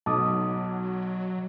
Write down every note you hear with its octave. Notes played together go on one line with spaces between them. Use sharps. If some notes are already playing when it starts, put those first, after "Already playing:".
B1 F#3 A5 D6 D#6